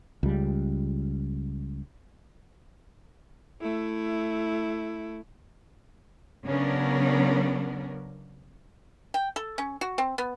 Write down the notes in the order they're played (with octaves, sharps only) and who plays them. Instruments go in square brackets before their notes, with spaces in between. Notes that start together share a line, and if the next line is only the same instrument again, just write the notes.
[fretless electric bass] C#2 G3
[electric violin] A3 E4
[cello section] C#3 F#3 B3 C#4 D4 A#4
[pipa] G5
A4
C#4
F#4
C4
B3